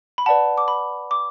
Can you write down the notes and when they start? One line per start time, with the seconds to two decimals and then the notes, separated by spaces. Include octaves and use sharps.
0.18 B5
0.26 B4 D5 F#5 A5
0.58 D6
0.68 B5
1.11 D6